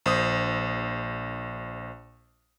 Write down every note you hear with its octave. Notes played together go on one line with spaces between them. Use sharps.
A#1 C5 D#6